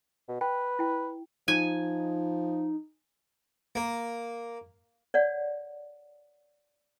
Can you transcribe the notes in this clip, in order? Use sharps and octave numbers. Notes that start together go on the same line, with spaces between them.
B2
B4 G5
E4 G5
F3 D#4 G#5
A#3
C#5 D5 F#5